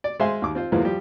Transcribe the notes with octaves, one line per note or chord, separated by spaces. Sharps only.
D5
G#3 C5 E5 F5 G#5 C6
D#2 D6
C4 F4 C5
E2 E3 F3 G#3 A#3
F3 G3 G4